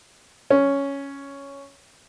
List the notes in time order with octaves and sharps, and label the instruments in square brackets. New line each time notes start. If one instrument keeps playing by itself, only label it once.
[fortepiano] C#4